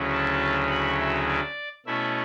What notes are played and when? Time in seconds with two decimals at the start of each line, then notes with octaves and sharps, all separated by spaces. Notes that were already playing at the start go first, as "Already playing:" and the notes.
Already playing: D2 C#3 F#3 C#4 E4
0.14 A5
0.71 B5
1.00 E5
1.29 D5
1.86 B2 A3 C#4 E4 E5